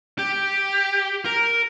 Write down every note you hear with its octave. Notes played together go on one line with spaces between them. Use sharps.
G4
A#4